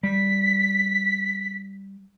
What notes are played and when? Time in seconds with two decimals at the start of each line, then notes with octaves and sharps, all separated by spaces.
0.03 G3 B6